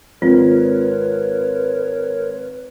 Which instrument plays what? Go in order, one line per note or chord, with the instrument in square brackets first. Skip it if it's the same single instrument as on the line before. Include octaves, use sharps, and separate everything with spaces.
[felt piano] G#1 C4 [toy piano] F4 [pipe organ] A#4 C#5 [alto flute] B4